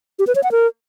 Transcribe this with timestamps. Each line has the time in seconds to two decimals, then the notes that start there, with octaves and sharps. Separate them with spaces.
0.19 G4
0.27 B4
0.35 C#5
0.43 F#5
0.52 A#4